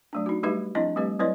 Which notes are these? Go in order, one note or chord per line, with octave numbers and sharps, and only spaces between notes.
F#3 A3 D4
D#4 F#4
G3 A3 D#4 G4 B4 E5
F3 C4 D4 E4 D#5
G3 A3 C4 G4 B4
F#3 C4 E4 B4 C#5 D#5